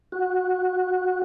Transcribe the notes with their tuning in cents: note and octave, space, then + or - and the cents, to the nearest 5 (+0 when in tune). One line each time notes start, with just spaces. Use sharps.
F#4 -15